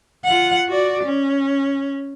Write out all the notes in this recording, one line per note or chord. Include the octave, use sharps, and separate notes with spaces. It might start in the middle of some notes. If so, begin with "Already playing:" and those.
F4 F#5
F#4 D5
C#4